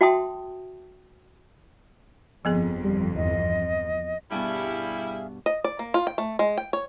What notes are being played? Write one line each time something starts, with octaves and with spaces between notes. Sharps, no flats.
F#4 E5 G5 A5 C6 D#6
G1 F2 F3 B3 G#4
G3
E2 D#5
G2 B2 G3 E4 G#4 E5 F5
D#5
D5
A#3
F4
G5
A3
G#3
G5
C#5